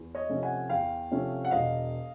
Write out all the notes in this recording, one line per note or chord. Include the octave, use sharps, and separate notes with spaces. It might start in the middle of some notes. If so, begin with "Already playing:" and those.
Already playing: E2
C#5 D#5
C3 F3 A3 C#4
F#5 G#5
E2 F5 G5
C3 F3 A3 C#4
F#5
E1 D#5 F5